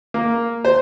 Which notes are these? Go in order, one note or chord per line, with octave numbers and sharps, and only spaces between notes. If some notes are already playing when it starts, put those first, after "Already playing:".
A#3
C5